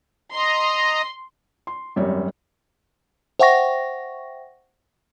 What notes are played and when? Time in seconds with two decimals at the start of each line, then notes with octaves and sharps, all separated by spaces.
0.32 D#5 A#5 C6
1.67 C6
1.96 G#1 F#2 G3 C#5
3.39 C5 E5 F#5 G5 C#6 A#6